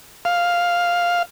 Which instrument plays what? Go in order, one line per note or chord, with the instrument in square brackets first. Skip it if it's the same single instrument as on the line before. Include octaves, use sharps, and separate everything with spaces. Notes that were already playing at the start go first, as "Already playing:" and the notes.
[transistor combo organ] F5